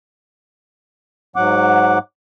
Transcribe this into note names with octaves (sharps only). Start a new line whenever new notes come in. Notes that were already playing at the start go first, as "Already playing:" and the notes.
G#2 F#3 F#5 D6